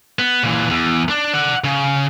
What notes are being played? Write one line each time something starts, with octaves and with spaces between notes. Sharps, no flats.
B3
A#2 E3
E2
D4
D5 F#5
C#3